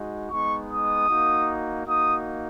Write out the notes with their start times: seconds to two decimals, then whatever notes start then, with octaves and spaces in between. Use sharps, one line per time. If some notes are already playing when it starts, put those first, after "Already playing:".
Already playing: G#3 D#4 F#4
0.29 G#3 B3 D#4 C#6
0.69 D#6
1.08 A#3 D#4 F#4
1.85 A#3 D#4 F#4 D#6